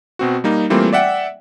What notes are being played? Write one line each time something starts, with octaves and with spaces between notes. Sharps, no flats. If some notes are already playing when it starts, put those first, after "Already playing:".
B2 C4 F#4
G3 A#3 D#4
E3 G3 A3 A#3 C4 F4
D5 E5 F#5 G5